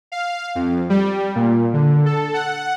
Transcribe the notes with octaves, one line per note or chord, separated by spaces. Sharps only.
F5
F2
G3
A#2
D3
A4
F#5